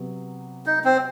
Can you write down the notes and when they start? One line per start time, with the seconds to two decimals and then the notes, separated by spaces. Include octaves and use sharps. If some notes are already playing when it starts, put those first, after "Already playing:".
Already playing: C3 F#3 B3
0.66 D#4
0.84 C4